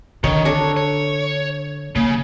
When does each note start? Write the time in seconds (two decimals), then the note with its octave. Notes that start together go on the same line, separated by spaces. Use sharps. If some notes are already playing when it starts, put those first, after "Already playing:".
0.24 D3 D#3 C#5
0.45 D4 A4 C#5
0.77 C#5
1.96 C#3 A#3